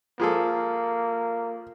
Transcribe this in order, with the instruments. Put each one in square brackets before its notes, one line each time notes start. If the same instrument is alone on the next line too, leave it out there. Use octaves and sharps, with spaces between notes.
[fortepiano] F3 G#4 A4 [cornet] A#3